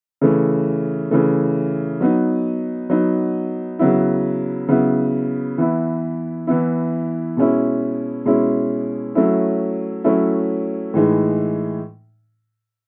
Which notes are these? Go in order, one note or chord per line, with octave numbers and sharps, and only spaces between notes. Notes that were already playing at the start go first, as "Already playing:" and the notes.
C#3 E3 A3
C#3 E3 A3
F#3 B3 D#4
F#3 B3 D#4
C#3 F#3 B3 E4
C#3 F#3 B3 E4
E3 B3 E4
E3 B3 E4
B2 G#3 C#4 E4
B2 G#3 C#4 E4
F#3 A3 C#4 E4
F#3 A3 C#4 E4
A2 E3 G#3 D#4